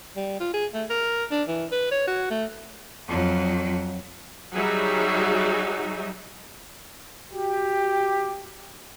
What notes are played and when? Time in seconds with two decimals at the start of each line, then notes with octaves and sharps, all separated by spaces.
0.16 G3
0.40 F4
0.54 G#4
0.74 A3
0.90 A#4
1.32 D4
1.48 E3
1.72 B4
1.92 C#5
2.07 F#4
2.31 A3
3.08 F2 F#3
4.55 F#3 G3 D#4 F#4 G#4 E5
7.32 F#4 G4